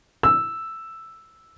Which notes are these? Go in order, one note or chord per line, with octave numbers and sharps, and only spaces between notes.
E6